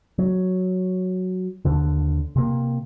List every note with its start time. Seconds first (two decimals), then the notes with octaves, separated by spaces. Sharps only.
0.18 F#3
1.65 D#2 D3
2.36 C3 A#3